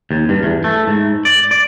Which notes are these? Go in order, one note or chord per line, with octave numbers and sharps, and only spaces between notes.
D#2
G2
E2
A3
G#2
D5
D5